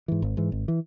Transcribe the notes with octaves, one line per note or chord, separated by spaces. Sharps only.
G#2 E3
G#1
G#2 E3
G#1
E3